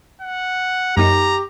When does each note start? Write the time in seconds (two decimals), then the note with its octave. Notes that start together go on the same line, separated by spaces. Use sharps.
0.21 F#5
0.97 F#2 A#3 D#4 G4 A#5